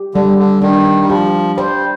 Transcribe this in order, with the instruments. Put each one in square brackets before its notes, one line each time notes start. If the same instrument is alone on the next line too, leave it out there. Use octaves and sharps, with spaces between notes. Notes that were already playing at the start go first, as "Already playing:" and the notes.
Already playing: [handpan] G4
[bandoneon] D3 [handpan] G3
[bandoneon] D3
[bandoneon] D#3 [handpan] D4
[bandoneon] G3
[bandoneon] F3 [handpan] G4
[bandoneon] G3 [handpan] C5